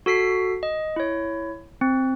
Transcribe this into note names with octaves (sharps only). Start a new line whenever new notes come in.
F#4 A4 B6 C7
D#5
E4 C#5
C4